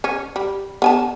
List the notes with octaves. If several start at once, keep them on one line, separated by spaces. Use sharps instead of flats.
C#4
G3
B3 G#5 A5